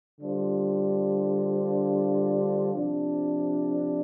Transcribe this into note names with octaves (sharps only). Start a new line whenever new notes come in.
D3 G3 D4 F4 C5
C3 F3 D4